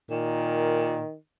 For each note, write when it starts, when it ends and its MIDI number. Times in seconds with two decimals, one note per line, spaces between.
0.10 1.04 46
0.10 1.15 51